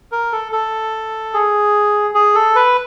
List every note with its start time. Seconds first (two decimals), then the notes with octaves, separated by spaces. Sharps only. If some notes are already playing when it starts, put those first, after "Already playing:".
0.12 A#4
0.32 A4
0.52 A4
1.34 G#4
2.15 G#4
2.35 A4
2.55 B4